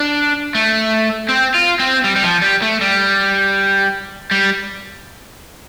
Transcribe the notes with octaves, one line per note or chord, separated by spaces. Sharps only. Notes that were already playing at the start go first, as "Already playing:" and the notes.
Already playing: D4
A3
C4
F4
C4
G3
G3
F3
G3
A3
G3
G3